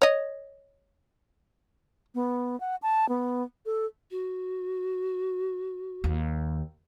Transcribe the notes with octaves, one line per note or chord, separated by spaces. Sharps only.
C#5 D#5
B3
F#5
A5
B3
A4
F#4
D#2